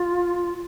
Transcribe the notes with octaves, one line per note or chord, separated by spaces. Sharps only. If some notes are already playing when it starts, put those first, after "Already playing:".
Already playing: F4